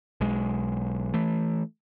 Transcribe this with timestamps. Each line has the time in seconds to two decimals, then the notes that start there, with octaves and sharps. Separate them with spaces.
0.21 B1 G#3
1.14 E3 A3